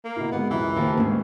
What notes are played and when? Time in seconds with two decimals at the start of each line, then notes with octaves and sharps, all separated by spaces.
0.04 A#3
0.16 B2 E4
0.32 G#2 B2 B3
0.50 C#2 F#2 E3
0.76 D#2 F3 A#3
0.97 D2 G#2 C#4